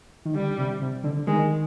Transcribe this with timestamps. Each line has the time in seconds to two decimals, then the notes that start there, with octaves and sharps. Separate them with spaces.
0.25 D#3
0.35 D3 G3
0.58 C3
0.82 C3
1.04 D3
1.27 D#3 G#3